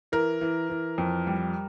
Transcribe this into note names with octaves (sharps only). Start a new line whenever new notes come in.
E3 A#4
E3
E3
F2
G3